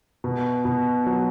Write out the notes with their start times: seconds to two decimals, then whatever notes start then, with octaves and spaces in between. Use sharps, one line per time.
0.24 B2
0.65 B2
1.06 F#3